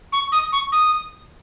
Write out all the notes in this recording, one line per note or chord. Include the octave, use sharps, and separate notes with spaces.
C#6
D#6
C#6
D#6